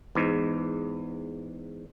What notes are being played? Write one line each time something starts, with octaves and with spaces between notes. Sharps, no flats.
E2 G#2